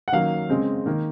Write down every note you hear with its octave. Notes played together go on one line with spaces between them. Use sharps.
F#5
D#3 F#3 A#3 C#4 F5
C#3 G#3 C4
D#3 A#3